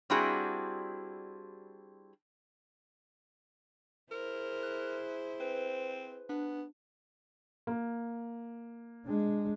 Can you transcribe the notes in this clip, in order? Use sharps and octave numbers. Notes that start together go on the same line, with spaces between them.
G3 C4 D4 E4 F#4 G#4
E4 G#4 A#4 C5
F#6
C4 B4
B3 D4
A#3
G#3 D4